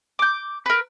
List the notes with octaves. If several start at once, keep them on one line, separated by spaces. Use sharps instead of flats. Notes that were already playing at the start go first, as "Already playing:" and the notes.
D6 G6
A#4 B4